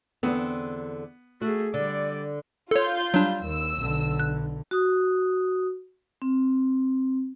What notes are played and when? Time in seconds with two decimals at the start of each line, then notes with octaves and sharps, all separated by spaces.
0.23 E2 D3 B3 C4
1.42 A3 F#4 G#4
1.74 D3 G3 D5
2.71 F4 A4 C#5 G6
3.14 F#3 G3 D4
3.44 D#2 E6
3.79 B1 D3
4.20 F#6
4.71 F#4 D#6
6.22 C4